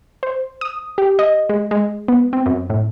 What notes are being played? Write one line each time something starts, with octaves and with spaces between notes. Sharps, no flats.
C5
D#6
G4
D#5
G#3
G#3
B3
C4
F#2
A2